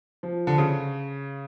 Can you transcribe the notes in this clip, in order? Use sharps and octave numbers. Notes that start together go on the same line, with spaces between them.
F3
D3
C#3